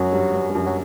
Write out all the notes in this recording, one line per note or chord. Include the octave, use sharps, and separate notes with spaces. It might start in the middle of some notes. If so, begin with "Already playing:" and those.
Already playing: F#2 F#3
G2
G2
G2
F#2
F#3